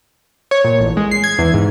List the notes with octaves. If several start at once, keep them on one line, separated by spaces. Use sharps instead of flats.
C#5
A#2
A1
G#3
C7
G#6
E2
G#2